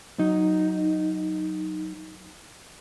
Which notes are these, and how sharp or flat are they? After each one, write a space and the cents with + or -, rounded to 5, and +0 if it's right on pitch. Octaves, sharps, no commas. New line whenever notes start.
F#3 +0 D#4 +0